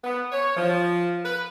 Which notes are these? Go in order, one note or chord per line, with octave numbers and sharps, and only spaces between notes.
B3
C#5
F3
B4